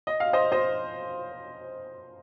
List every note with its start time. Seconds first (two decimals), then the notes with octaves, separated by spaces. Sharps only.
0.07 D#5
0.20 F5
0.33 C5 D#5
0.52 C5 D#5